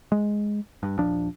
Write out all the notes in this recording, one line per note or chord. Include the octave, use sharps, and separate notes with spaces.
G#3
G2
D#1 A#1 F3 D4